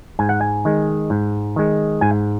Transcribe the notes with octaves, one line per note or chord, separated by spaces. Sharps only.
G#2 G#5
F#5
G#5
D#3 G#3
G#2
D#3 G#3
G#2 G#5